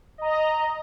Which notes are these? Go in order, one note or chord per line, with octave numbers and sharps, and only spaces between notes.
D#5 A#5